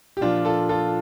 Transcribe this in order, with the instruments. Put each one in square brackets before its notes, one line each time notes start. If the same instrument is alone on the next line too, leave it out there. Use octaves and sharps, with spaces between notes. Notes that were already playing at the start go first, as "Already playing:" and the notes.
[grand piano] G4
A#2 F3 D4 F4
F4 A4
F4 A4